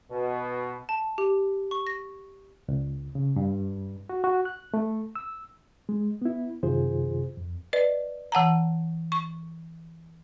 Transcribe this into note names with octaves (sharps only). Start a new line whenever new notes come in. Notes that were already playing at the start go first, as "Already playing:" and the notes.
B2
A5
G4
C#6
A#6
C#2
C#3
G2
F#4
F#4
F#6
A3
E6
G#3
B3 E4
F#2 C3 D#3 F4 G#4 C5
F2
B4 D5 D#5
E3 F#5 A5 A#5
C#6